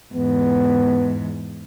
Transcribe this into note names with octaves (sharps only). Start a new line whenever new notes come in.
E2 G#2 B3